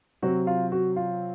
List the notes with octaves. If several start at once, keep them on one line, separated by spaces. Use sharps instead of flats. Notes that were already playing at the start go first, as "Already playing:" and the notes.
C3 F#3 C4 F#4
F4
F#4
F4